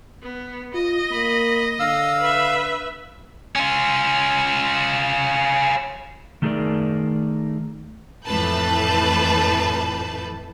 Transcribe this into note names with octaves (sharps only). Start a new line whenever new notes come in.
B3
F4 D#5
A#3 B5
D3 F5 E6
B4 E5
C#4 F4
D#3 A3 D#4 G#4 A#4 D5
F2 A2 E3 B4 A5 G6